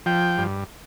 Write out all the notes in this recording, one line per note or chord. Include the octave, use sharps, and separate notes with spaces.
F3 G5
G2